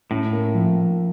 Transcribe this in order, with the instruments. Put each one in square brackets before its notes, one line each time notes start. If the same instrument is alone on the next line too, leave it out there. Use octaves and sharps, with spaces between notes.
[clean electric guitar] A2 [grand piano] C#4
[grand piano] A#3
F3